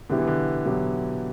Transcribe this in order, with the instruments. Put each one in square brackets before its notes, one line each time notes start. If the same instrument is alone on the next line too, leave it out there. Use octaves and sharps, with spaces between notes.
[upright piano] B2 F#3 B3 E4 G4 [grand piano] D3
[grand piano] E3
D3
[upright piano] B2 F#3 B3 E4 G4